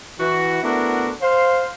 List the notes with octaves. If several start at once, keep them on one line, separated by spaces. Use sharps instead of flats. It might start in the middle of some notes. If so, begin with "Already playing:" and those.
E3 F#4
A3 B3 D4 E4 F#4 A#4
C5 F5